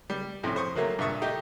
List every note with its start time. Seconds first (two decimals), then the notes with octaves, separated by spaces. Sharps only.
0.10 G3
0.43 F2 A2 C3 C#4
0.56 C5 C#6 D#6
0.75 D#3 F#3 A3 A#3
0.99 G2 A#2 E5 C#6 D#6
1.22 A3 D#4 G4